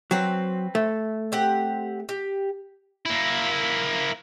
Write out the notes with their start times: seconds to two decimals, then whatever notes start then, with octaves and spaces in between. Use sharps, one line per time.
0.11 F#3 C4 B4
0.75 A3
1.32 C4 G4 F#5
2.09 G4
3.05 A#3 E4